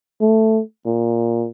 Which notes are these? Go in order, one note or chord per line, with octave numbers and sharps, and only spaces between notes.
A3
A#2